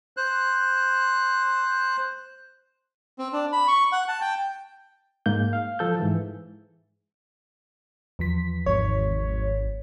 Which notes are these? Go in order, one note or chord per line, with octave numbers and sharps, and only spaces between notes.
C5 F#6
C4
D4
B5
C#6
F#5
A5
G5
G#2 A#3 G6
F5
F3 A4 G6
G#2 E3
E2 F3 B6
G#1 C#5